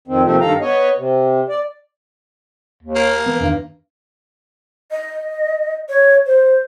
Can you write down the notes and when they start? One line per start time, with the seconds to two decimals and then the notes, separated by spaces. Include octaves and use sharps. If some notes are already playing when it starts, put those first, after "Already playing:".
0.08 F2 D#3 C4
0.24 D#2 C3 D#3 F3 A3 C4
0.41 G2 D#3 A4 F5 A#5
0.61 B3 C#5 D#5
0.98 C3
1.49 D5
2.83 D#2
2.96 A#3
3.26 E3 B3
3.40 E2 G2 D#3
4.91 D#5
5.89 C#5
6.26 C5